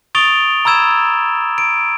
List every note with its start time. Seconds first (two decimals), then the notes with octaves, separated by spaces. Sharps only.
0.15 C#6 D#6 A6 D7 F7 G7
0.65 A#5 B5 E6 G#6 E7
1.58 D7